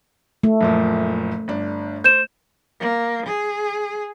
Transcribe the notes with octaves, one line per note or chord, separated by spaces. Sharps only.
A3
F#1 A#2 F3
G1 D4
C5 G6 E7
A#3
G#4